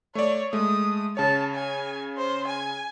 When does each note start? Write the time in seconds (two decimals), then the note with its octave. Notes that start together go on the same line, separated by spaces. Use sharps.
0.15 A3 C#5 D5
0.53 G#3 A3 D#6
1.17 C#3 C#5 A5
1.55 G#5
2.18 C5
2.48 G#5